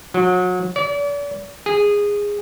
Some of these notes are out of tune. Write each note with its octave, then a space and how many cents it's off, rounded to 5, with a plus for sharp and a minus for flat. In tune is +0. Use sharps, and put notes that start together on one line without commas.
F#3 -30
D5 -40
G#4 -15